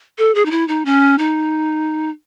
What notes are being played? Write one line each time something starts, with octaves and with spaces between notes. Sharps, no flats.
A4
G#4
D#4
E4
D#4
C#4
D#4